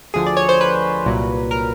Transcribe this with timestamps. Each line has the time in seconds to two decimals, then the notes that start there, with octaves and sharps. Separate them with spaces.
0.14 D2 D3 F3 G#4
0.26 D5
0.37 C#5
0.49 C5
0.61 B4
1.05 C2 A#2 F#3
1.51 A#4